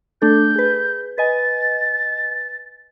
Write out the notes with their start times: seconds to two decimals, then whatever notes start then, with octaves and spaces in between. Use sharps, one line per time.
0.22 A3 D4 A4 G6
0.56 G#4 B4
1.18 B4 D#5 G#5 A6